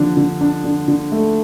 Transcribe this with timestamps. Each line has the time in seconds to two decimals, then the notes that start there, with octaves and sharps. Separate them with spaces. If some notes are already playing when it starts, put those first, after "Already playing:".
Already playing: D3 F3 D4
0.17 D3
0.41 D4
0.64 D3
0.88 D3
1.12 A3